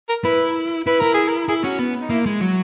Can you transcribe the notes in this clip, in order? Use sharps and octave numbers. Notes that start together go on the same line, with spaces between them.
A#4
E4 B4
E4 B4
E4 A#4
G#4
A#4
E4 G#4
C#4 F#4
B3
D#4
A#3 E4
G#3
F#3 F#4